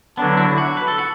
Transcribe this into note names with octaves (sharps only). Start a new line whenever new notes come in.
D3 F#3 B3 D4
E4
F#4
B4
A4
F#4